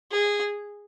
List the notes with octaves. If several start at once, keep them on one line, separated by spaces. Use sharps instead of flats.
G#4